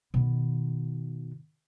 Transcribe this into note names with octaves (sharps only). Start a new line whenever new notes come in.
B2 D#3